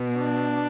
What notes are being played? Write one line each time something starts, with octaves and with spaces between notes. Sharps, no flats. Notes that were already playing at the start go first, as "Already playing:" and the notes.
Already playing: B2
D4